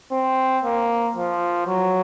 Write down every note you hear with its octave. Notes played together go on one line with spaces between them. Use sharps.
C4
A#3
F3
F#3